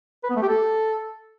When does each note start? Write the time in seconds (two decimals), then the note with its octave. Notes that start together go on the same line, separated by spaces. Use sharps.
0.24 B4
0.30 B3
0.36 A3
0.43 G4
0.49 A4